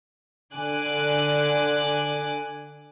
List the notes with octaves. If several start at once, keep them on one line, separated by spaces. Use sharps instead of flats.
D3 G#5 D6 F#6